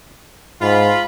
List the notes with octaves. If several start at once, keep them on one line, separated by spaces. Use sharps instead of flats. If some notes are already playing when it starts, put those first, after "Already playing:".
G#2 F4 B5